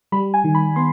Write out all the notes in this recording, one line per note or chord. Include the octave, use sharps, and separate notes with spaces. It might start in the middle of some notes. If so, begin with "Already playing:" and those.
G3 B5
G#5
D#3
B5
B3 C6